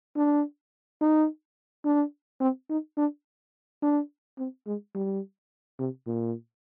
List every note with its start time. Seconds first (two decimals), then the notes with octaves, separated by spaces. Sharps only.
0.16 D4
1.01 D#4
1.85 D4
2.41 C4
2.69 D#4
2.97 D4
3.82 D4
4.38 C4
4.66 G#3
4.95 G3
5.79 C3
6.07 A#2